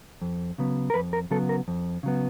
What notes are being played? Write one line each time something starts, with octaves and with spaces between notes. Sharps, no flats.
F2
C#3 F#3 B3
A#4
F2 B4
A#4
C#3 F#3 B3 A4
A#4
F2
C#3 F#3 B3